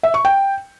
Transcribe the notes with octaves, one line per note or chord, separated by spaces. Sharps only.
E5
C#6
G5